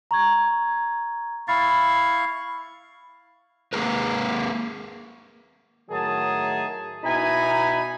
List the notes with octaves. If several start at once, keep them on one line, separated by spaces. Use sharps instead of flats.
A#5 C#6 G#6
E4 F5 B5 C#6 A6
G#3 A#3 G#4 A#4 B4
A2 D#3 F#3 G#4 A5
B2 D#4 E4 G#5 B5